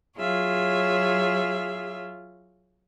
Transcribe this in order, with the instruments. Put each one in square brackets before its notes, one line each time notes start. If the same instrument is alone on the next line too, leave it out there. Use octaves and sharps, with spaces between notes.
[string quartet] F#3 F4 G#4 C#5 E5